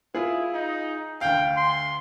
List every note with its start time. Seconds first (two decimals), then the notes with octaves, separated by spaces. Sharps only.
0.15 E4 F4 G#4
0.54 D#4
1.21 D2 F5 G5
1.57 C6